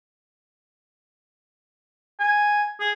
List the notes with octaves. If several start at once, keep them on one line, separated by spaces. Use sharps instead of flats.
G#5
G#4